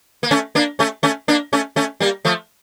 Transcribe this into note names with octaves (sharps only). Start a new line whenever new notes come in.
A#3
A3 C#4
A#3 D4
A3 C#4
A3 C#4
A#3 D4
A3 C#4
A3 C#4
G3 A#3
F3 A3